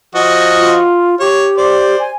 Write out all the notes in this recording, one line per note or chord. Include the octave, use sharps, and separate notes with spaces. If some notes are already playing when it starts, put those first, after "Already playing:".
F3 F#4 D#5
F4
G4 C#5
C5 D5
G#5